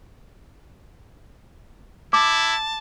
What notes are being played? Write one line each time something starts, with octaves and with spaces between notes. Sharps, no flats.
E4 A5 D6